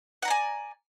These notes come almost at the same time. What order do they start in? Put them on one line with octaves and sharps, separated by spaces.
F#5 A#5 D5 G#5